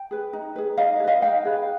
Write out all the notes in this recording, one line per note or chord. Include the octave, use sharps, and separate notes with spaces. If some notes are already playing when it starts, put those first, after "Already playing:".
Already playing: G5
G#4 B4
D#4
G#4 B4
D#4 D#5 F5
G#4
B4 D#5 F5
D#4 F5 G5
G#4 B4